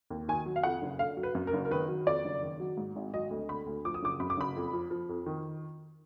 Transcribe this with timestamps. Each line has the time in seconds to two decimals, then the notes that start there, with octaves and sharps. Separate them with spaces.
0.10 D#2
0.28 D#3 G#5
0.46 F#3
0.56 F5
0.63 F2 F#5
0.82 F#1
0.99 D3 F5
1.17 F#3
1.23 B4
1.35 F#2
1.47 A#4
1.53 F#1
1.65 A#4
1.71 D#3 B4
1.88 F#3
2.06 F2 D5
2.25 F#1
2.42 D#3
2.60 F#3
2.77 G#2
2.96 G#1
3.14 F#3 D#5
3.31 D2
3.49 D3 B5
3.66 D2
3.85 F3 D6
3.94 D#6
4.03 F#1 D6
4.20 F#2 B5
4.30 D6
4.37 F#1 B5
4.56 F2
4.73 F3
4.91 F3
5.09 F2
5.26 D#3